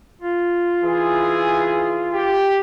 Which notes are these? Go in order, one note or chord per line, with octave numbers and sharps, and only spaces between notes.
F4
E3 G#4
G4